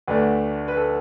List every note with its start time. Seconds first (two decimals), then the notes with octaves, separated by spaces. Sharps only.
0.08 D2 D3 A3 D4 B4
0.68 B4
0.77 A4